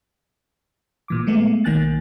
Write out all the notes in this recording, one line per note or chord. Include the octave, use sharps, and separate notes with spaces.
A#2 E3 D6
G#3 A3 B3
B1 D#3 A#3 G#5 F#6 A6